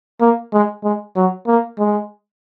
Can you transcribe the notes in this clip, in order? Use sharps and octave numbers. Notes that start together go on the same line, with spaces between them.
A#3
G#3
G#3
F#3
A#3
G#3